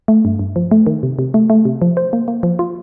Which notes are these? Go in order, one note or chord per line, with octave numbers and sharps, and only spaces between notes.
A3
G2
G2
F3
A3
D#3
C3
C3
A3
A3
C3
F3
C5
A#3
A#3
F3
F4